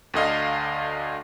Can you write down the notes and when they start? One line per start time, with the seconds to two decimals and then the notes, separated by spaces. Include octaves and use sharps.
0.14 D2 D3 D#5 F5